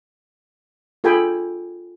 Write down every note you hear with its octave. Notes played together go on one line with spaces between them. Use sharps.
F4 G#4 A4 G5 G#5 B5